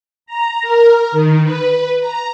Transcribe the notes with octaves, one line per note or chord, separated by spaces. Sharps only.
A#5
A#4
D#3
B4
A#5